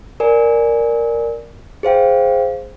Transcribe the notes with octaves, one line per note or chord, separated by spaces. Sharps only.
A#4 D5 G#5
G#4 C5 F5 G5